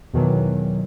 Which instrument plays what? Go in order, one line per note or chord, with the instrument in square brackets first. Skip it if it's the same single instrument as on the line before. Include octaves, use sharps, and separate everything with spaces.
[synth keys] E2 B2 D#3 E3 F#3